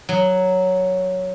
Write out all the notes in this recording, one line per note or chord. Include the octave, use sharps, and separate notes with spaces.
F#3